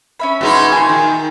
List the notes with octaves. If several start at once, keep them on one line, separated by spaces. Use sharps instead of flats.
C#4 E5 B5
B2 G#3 D#4
A#2 G#5 A5 C6
D#3